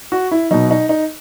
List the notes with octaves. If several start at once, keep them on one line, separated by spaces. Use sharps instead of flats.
F#4
E4
B2 F#3 D#4
D#4
D#4